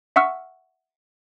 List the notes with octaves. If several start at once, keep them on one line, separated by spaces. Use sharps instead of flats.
E5 F#5 C#6 E6 F6